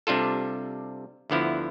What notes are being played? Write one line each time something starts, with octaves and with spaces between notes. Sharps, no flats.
C3 G3 D4 F4 A4
D2 D3 F3 B3 E4